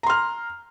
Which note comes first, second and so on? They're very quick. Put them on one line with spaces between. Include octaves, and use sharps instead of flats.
A#5 C6 F6